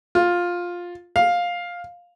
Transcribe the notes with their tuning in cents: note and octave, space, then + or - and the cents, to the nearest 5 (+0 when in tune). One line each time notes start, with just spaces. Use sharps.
F4 +10
F5 +10